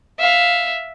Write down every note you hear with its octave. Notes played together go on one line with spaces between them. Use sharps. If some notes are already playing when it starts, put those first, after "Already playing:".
E5 F5